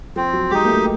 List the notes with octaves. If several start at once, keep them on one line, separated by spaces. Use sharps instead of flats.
F3 C4
F#3
G#3 D#4 G4
A#3
A3